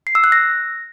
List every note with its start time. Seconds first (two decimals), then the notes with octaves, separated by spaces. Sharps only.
0.07 C7
0.15 E6
0.24 F#6
0.32 A#6